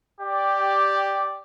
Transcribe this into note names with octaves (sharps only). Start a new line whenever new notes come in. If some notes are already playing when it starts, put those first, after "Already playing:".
G4 D5